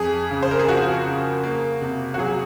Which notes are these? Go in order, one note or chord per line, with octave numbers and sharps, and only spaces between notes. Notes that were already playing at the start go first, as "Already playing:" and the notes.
Already playing: F2 G#4
C#3
C5
A#4
G#4
F3 F#4
C#3
A#3
C3
F#4
F#3 G#4